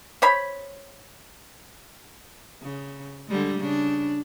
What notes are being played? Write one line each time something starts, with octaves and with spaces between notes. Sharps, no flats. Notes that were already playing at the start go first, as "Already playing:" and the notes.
C5 C#5 B5
C#3
D3 G3 G#3
C#3 D4